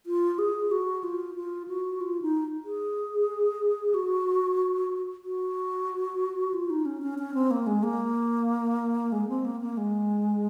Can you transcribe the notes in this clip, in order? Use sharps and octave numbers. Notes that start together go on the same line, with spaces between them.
F4
G#4
F#4
F4
F4
F#4
F4
D#4
G#4
F#4
F#4
F4
D#4
C#4
C#4
C#4
C4
A#3
G#3
A#3
G#3
C4
A#3
A#3
G#3